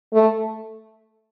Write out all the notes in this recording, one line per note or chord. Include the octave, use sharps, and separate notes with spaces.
A3